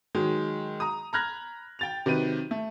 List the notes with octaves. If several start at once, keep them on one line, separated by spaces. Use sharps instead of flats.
D#3 F#3 G#3
A#5 D#6
A#5 B5 F6 F#6 G#6 A#6
G5 A6 F7
C3 D#3 F#3 B4 D#7
A3